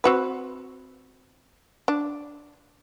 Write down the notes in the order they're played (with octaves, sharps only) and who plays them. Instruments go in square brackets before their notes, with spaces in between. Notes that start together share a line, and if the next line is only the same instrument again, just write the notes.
[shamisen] C4 F#4 B4
D4